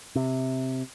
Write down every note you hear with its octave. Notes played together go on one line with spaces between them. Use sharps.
C3